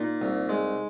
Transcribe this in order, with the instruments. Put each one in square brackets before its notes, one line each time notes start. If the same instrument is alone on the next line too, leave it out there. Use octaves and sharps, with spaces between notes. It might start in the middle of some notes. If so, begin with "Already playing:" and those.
Already playing: [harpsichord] A#2 [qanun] D#4
[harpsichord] C2
G#3